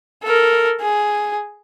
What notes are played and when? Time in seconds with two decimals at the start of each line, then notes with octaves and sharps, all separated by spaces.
0.24 A4 A#4
0.81 G#4